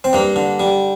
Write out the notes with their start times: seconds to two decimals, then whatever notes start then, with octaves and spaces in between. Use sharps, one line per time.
0.04 C4
0.13 G2 A#3
0.36 D3
0.60 G3